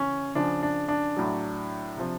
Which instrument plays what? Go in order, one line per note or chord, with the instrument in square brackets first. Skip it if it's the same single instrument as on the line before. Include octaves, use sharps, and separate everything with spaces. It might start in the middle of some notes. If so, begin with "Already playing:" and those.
Already playing: [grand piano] C#3 E3 C#4
C#3 F3 D4
D4
D4
A2 F#3
C3 F3